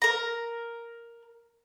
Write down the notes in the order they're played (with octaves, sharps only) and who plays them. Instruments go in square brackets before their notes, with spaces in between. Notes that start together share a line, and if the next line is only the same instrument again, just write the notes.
[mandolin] A#4 A#5